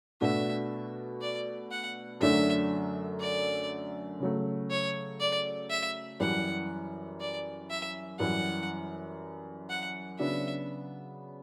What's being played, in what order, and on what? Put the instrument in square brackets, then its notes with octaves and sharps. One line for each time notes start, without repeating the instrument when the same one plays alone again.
[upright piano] B2 A3 D4 F#4 [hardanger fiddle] E5
[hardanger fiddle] D5
F#5
[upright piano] F#2 D3 F#3 A3 D4 [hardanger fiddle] E5
[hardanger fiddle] D5
[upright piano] C#3 F#3 A3
[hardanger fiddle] C#5
D5
E5
[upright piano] F#2 E3 G3 [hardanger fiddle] F#5
[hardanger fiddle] D5
E5
[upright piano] F#2 E3 G3 [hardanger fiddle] F#5
[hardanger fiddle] F#5
[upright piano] C#3 F#3 B3 D4 F#4 [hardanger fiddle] E5